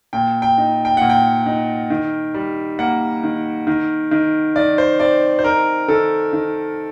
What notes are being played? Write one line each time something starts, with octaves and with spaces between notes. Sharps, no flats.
A#2 G5
G5
D#4
G5
A#2 F#5
G5
D#4
D#3
G3
A#3 F#5
D#3
D#3
D#3
D#3 D5
C5
C4 D5
C5
D#4 A#4
D#3 A4
D#3